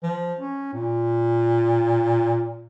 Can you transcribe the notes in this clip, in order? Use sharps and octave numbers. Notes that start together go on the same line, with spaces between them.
F3
C#4
A#2